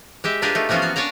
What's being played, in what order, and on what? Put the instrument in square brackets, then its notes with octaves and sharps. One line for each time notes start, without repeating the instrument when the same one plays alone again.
[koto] G#3 G4 E5
D4 F4 G4 G#4 A#4 B4
A3 D#4
E3 F3 A#3 B3 C#4 F4
F#4 F5
D4 C#5 D5 G#5 A#5